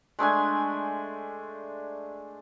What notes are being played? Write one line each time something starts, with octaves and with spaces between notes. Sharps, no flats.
G#3 A3 D4 G#5